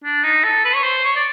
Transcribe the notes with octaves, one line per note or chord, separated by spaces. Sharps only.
D4
D#4
A4
B4
C#5
C5
C#5
D5